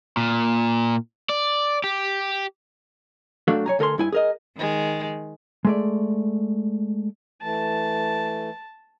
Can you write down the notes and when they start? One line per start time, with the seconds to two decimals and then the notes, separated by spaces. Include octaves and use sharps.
0.17 A#2
1.29 D5
1.84 G4
3.48 F#3 A3 D4 F#4 A4 F5
3.66 C#5 G#5 A#5
3.79 D2 A4 A#4 G#5 C6
3.98 G2 E4 G#5
4.12 G#4 A#4 D#5
4.55 D#3 G#3
5.65 G#3 A3 D5
7.42 E3 A3 A5